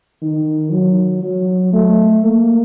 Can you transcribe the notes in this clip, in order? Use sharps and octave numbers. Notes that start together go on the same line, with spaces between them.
D#3
F#3
F#3
A3
A#3